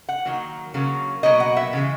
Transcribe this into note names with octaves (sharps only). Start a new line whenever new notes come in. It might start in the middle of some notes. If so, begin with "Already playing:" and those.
F#5
D#3 F#3 A#3
C#3 F#3 A#3
B2 F#3 A#3 D#5
F#5
E5
C#3 E3 G#3